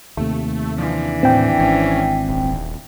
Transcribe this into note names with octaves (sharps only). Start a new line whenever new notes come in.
D#2 C3 A3
E3 F3 D4
A2 C4 G5
G#1 C#4
D#1